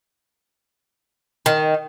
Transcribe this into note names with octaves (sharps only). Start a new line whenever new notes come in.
D#3